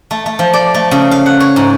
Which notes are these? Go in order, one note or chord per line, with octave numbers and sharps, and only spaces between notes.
A3
A3
F3
D5
A3
C#3
F5
F#5
C#5
G#2